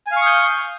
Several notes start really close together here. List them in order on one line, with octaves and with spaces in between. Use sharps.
G#5 F5 C#6 D#6 G6